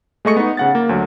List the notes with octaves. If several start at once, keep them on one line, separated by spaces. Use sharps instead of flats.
G#3 A3 D#5 C#6 C#7
B3 D#4
C#3 F#5 A6
A#3
D2 F#3